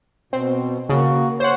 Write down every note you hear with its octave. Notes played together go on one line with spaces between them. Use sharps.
B2 C4
C#3 A#3 F#4
C5 C#5 F#5